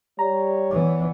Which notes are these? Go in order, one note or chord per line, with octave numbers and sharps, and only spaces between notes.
G3 C#5 A#5
E3 B3 D5